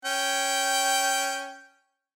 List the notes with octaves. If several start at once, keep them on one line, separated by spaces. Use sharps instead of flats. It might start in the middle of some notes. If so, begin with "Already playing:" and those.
C#4 G5